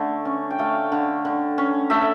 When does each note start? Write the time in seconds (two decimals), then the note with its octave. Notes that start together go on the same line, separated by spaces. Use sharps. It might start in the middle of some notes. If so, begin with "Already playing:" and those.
Already playing: D3 A3
0.25 C#4
0.51 G5
0.59 A3 F5
0.92 D3
1.25 D3
1.58 C#4
1.90 A3 E5